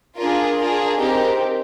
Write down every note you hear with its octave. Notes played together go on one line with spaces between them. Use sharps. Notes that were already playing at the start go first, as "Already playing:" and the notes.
D4 F4 G#4 A#4
D4 F4 G#4 A#4
C4 D#4 G4 A#4